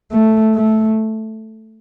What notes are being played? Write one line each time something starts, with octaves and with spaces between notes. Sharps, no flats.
A3
A3